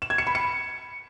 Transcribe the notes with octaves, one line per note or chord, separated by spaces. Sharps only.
E7
G#6
C#7
B5
C#7